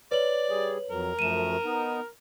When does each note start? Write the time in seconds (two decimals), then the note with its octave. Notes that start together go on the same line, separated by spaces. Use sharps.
0.11 B4 C#5 D5 F#7
0.50 G3 G#4
0.90 F2 F#3 A#4
1.19 F#2 F3 A3 D#7 E7
1.64 B3 D#4